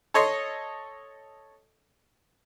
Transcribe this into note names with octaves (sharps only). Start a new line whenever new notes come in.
A4 C#5 D#5 C6